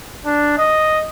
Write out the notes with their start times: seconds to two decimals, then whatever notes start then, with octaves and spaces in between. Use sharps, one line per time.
0.26 D4
0.58 D#5